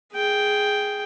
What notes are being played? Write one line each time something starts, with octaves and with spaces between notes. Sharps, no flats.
G#4 G5